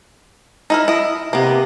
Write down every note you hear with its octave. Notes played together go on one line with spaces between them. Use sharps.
D#4 E4 A#4
E4 D#5
C3 A#3 B3